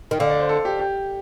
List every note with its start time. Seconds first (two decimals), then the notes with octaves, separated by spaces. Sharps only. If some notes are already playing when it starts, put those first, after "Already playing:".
0.11 D#3
0.19 D3 F5
0.29 D5
0.40 C5
0.49 A4
0.65 G4
0.80 G4